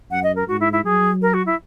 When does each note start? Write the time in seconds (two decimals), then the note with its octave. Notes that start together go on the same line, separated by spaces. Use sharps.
0.11 F#2 F#5
0.23 D#5
0.35 A#4
0.48 G#2 F#4
0.60 E4
0.72 E4
0.84 F#3 G#4
1.22 A#4
1.34 F#4
1.46 E4